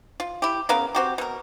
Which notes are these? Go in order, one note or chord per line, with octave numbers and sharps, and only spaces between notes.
F4
E4 G4
C#3 B3 A#4 F5
C4 F#4 G4
B2 A#4